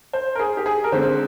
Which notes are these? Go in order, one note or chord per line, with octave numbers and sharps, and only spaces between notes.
C5
A#4
G#4
G4
G#4
A#4
D3 G#3 C4 C5